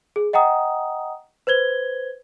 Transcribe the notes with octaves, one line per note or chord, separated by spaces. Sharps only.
G#4
D#5 F#5 G5 A#5 D#6
B4 C5 G#6 G7